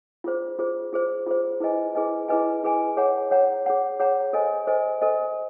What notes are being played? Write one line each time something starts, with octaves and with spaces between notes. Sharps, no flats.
F4 G#4 C5
F4 G#4 C5
F4 G#4 C5
F4 G#4 C5
E4 G#4 B4 D#5 G#5
E4 G#4 B4 D#5 G#5
E4 G#4 B4 D#5 G#5
E4 G#4 B4 D#5 G#5
G#4 C#5 F#5 A#5
G#4 C#5 F#5 A#5
G#4 C#5 F#5 A#5
G#4 C#5 F#5 A#5
A4 C5 D#5 G#5
A4 C5 D#5 G#5
A4 C5 D#5 G#5